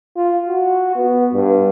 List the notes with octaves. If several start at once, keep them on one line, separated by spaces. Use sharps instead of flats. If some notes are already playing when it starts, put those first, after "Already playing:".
F4
F#4
B3
G2